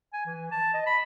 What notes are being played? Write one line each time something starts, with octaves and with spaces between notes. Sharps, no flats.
G#5
E3
A5
D#5
B5